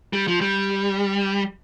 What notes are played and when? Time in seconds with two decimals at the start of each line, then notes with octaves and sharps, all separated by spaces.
0.13 G3
0.28 F3
0.41 G3